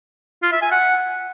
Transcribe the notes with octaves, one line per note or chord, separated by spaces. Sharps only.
F4
E5
G#5
F#5